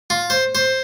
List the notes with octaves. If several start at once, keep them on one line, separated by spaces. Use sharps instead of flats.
F4
C5
C5